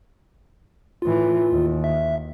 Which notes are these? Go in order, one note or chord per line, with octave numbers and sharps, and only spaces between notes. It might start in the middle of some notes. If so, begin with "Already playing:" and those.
A2 E3 F4
D#2
E5